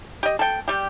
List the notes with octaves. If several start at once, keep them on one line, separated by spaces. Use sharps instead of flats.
G4 D#5
A4 G5
G3 G4